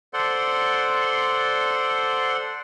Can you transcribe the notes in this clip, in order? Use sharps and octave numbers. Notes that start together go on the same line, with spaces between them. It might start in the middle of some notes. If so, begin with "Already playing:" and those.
A4 C5 D5 F#5 C6